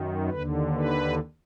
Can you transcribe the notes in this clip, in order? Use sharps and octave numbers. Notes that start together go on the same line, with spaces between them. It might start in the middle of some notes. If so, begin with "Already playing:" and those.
Already playing: F#2 D#3
D#2 D3 B4
B4